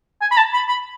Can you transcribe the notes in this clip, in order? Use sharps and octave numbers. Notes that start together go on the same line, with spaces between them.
G#5
B5
A5
B5
B5